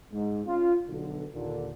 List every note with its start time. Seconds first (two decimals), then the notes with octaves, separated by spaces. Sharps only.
0.12 G#2
0.46 C#4 F4
0.88 B1 D3
1.33 D#2 A#2 D3